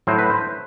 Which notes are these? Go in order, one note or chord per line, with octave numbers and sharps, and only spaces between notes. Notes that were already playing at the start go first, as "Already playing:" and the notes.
A2 F#3 C5
B4
C5